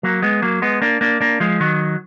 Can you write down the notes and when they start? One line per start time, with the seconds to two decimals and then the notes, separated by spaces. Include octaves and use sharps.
0.03 F#3 A#3
0.22 G#3 B3
0.42 F#3 A#3
0.62 G#3 B3
0.82 A#3 D4
1.01 A#3 D4
1.21 A#3 D4
1.40 F3 G#3
1.60 D#3 F#3